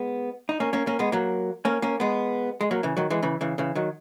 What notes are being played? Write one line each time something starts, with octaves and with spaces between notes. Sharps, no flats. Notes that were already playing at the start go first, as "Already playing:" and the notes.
Already playing: G#3 B3
D#4
A#3 C#4
A#3 C#4
A#3 C#4
G#3 B3
F#3 A#3
A#3 C#4
A#3 C#4
G#3 B3
G#3
F#3 A#3
C#3 E3
D#3 F#3
E3 G#3
C#3 E3
C#3 E3
C#3 E3
D#3 F#3